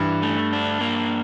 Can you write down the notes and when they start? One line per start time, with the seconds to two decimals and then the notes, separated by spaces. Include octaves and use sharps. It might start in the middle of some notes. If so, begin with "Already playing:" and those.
Already playing: G2 E3
0.22 A3
0.52 D4
0.81 A#3